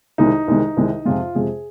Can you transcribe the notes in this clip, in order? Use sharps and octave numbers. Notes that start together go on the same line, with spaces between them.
C2 C3 D#3 G#3 D#4
C2 C3 D#3 G#3
C2 C3 D#3 G#3
F2 C3 G#3 F4
F2 C3 G#3 G#4